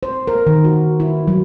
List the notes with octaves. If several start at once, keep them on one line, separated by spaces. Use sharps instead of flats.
C5
A#4
D#3
F#4
E4
F#3